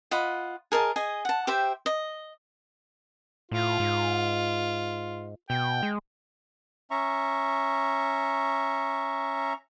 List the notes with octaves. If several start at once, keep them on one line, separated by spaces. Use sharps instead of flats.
F4 D#5 F#5 B5
G#4 A#4 D#5 A5
G#4 D#5 G#5
F#5 A5
G4 C5 E5 G5
D#5
A2 F4
G#2
B2 G5
G#3
C#4 E5 A#5 C#6